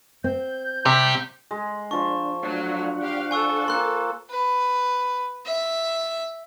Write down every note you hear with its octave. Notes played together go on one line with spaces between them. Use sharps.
C4 G6
C3 G3 G4
G#3
F3 D4 A5 C#6
F#3 A3 D4 F4 F#5
G4 F5
A4 G#5 C#6 E6
A#3 C6 F#6
B4
E5